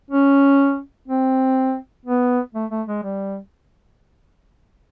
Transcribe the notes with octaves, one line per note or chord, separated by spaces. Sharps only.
C#4
C4
B3
A3
A3
G#3
G3